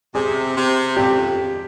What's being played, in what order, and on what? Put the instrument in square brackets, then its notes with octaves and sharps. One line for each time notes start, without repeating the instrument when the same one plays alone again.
[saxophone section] C3 [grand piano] G#4
[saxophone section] C3
[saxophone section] F2 [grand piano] G4